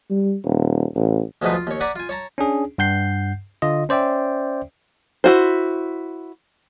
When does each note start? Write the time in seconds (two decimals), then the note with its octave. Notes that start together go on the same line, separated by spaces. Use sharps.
0.10 G3
0.45 D#1
0.95 A1
1.42 D2 F3 F#3 G#3 D#4 B4
1.53 F4
1.67 D#2 C#5
1.80 D5 F#5 G#5 A#5 B5 D6
1.96 F4 G#5
2.09 C#5 A5 A#5
2.38 C#4 D4 G#4
2.78 G2 F#5 G6 C7
3.62 D3 F4 D#5
3.89 C#4 C5 D5 E5 G5
5.24 E4 F#4 C5